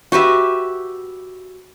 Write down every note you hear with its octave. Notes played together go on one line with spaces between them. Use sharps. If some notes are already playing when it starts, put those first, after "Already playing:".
F#4 G4 B4 E5